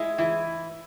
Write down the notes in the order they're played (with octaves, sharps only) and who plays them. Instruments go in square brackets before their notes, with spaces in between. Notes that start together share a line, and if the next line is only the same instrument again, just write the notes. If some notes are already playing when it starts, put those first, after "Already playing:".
Already playing: [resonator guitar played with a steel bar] G#3 [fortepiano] E4
[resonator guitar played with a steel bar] E3 [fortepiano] E4